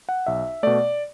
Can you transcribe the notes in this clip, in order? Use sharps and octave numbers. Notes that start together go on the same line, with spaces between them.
F#5
B1 E5
B2 A3 D5